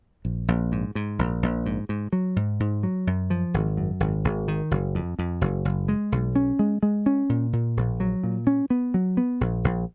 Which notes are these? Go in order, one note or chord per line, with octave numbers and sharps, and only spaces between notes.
A#1
A#1
G#2
G#2
A#1
A#1
G#2
G#2
F#3
G#2
G#2
F#3
F#2
F3
G#1
F#2
G#1
G#1
D#3
F#1
F2
F2
F#1
F#1
G#3
B1
C#4
G#3
G#3
C#4
A#2
A#2
A#1
F#3
A#2
C#4
B3
F#3
B3
A#1
A#1